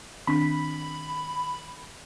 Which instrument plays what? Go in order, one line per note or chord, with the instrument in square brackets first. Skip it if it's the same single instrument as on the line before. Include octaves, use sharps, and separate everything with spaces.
[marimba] D#3 C4 D4 [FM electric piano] B5